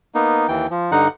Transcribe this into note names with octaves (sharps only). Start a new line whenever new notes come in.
A#3 B3 D#4
D#2 E3 G5
F3
G2 D3 D#4 F#5